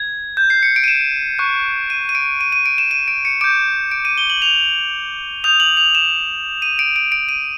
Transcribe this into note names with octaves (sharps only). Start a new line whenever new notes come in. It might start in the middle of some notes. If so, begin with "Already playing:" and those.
Already playing: G#6
G6
C7
C#7
D7
D#7
E7
C#6 F#6
D#7
D#7
D7
D#7
D#7
D7
E7
D#7
D7
C#7
D6 G6 D7
D7
D#7
G7
F#7
F7
D#6 G6 F7
F#7
F7
E7
D#7
D7
D7
D7
D#7